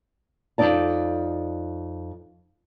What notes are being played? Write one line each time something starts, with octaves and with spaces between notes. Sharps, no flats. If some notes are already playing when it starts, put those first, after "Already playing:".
F2 G#2 D#4 D5 A5